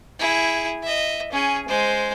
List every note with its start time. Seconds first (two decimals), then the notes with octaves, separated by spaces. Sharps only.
0.19 E4 G#4
0.83 D#5 E5
1.32 C#4 G#4
1.68 G#3 C5